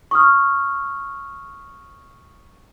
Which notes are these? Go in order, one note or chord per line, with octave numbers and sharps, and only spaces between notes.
C#6 D#6 F6